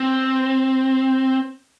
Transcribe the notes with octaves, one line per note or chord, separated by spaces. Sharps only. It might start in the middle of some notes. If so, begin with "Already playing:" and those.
Already playing: C4